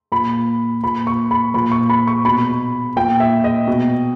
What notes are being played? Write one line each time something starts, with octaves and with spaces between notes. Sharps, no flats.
A#2 B5
A#2 B5
C#6
B5
A#2 B5
C#6
B5
C#6
B2 B5
A#2 G5
E5
D#5
B2